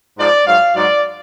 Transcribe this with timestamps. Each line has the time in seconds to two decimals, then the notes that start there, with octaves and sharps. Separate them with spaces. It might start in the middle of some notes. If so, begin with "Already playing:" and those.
0.18 G#2 F3 D5
0.46 G#2 F#3 F5
0.74 G#2 F#3 D5